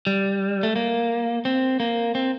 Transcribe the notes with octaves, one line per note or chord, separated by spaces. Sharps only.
G3
A3
A#3
C4
A#3
C4